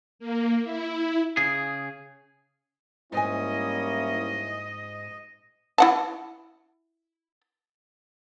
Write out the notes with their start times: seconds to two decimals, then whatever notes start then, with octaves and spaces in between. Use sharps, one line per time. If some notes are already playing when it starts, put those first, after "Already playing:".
0.19 A#3
0.63 E4
1.37 C#3 G#4
3.12 G#2 G3 A#3 C#4 E4 D#5 G#5
5.78 E4 F#5 A5